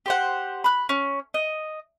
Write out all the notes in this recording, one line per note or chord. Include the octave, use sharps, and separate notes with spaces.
G4 C5 F#5
B5 F#6
C#4
D#5